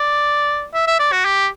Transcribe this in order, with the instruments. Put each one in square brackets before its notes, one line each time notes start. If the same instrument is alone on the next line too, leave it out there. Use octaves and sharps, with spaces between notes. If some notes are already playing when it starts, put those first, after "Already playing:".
Already playing: [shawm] D5
E5
E5
D5
F#4
G4